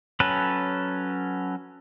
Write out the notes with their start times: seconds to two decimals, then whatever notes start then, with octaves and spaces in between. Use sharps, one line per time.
0.20 F#3 C#4 A4 B4